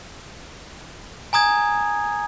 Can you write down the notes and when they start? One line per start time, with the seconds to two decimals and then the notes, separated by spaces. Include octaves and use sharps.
1.33 G#5 A#5 D#6 G#6